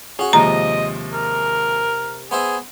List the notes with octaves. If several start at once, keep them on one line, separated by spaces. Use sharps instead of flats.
C#4 F#4 G#4
D#2 C3 F3 G#3 D#5 A#5
A#4
B3 G#4 C5 E5